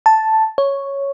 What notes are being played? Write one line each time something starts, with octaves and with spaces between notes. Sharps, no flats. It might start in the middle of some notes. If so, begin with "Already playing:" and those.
A5
C#5